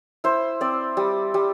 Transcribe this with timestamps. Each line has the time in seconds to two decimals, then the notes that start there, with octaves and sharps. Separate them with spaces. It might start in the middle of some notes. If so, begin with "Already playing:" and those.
0.24 E4 C5
0.61 C4 D5
0.97 G3
1.34 G3